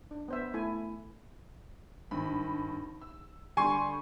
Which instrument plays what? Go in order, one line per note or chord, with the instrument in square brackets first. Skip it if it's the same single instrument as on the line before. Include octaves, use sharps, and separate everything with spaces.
[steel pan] D4
B3 C5 E5
A3 E4 A4 G#5
[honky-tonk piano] G#1 G2 B5
E6
[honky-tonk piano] D3 G3 [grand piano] G#5 C6 C#6